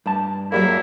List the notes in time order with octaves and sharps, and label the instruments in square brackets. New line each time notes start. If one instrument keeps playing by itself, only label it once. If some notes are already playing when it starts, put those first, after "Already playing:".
[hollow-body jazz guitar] G2 A5
[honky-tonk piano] F#3 G3 A#3 [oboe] E4